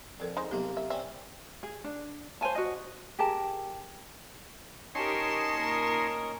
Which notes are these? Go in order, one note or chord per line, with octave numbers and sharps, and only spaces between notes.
F2 A4 A#4 D5
G#3 D#4 C5
C2 F#3 A#3 B3 G4
E5
C4 C#4 D5 E5
G#4
D4
C5 C#5 G#5 A5
F#4 D#5
G4 G#4 A#4 A5
C#4 D#4 G4 A#4 C#5 D#5 A5 C6
A#2 A#4